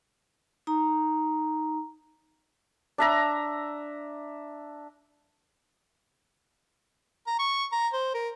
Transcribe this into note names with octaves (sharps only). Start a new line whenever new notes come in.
D#4 A#5
D4 E5 A#5
A#5
C#6
A#5
C5
A#4